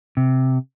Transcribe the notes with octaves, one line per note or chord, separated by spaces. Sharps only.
C3